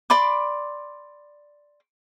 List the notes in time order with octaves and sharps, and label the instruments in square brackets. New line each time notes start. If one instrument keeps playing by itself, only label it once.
[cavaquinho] D5 B5 C6 D6